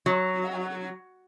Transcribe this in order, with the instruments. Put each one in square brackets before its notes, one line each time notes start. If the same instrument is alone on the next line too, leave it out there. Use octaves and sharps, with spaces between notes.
[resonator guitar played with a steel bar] F#3